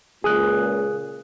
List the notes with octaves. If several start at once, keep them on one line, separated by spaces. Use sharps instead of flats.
C#2 A#2 G#4 D#6 F#6